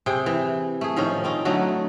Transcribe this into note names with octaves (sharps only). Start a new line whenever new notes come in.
C3 G#4 G5
E3
A3 G#4
A2 D#3 F3 C#4
C4 C#4 D#4
D3 F#3 A3 D#4